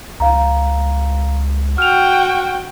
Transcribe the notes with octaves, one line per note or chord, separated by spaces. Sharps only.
C#2 F5 A#5
F#4 G5 F6 F7